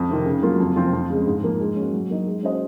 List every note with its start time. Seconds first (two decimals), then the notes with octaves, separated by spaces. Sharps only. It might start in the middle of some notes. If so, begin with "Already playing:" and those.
Already playing: F2
0.10 C3 D#3
0.26 C#3
0.42 F#3 A#3 F4
0.60 F2
0.76 C3 F3 C4 F4
0.93 F2
1.10 C#3 G#3
1.27 G#2
1.43 F3 A#3
1.60 G#3
1.76 C#4 F#4
1.93 F#3
2.10 A#3 D#4
2.27 G#3
2.43 C#4 F#4 C5 D#5